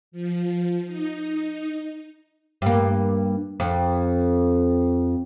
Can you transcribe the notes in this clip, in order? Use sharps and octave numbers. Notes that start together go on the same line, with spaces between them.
F3
D#4
G2 A#3
F2